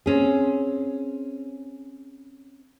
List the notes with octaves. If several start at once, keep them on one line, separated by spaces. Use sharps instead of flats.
C4 C#4 G#4